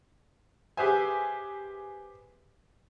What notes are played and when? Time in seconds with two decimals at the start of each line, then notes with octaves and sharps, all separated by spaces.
0.77 G4 G#4 B4 C5 E5 G#5